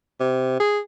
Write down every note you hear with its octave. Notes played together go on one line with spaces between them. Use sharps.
C3
G#4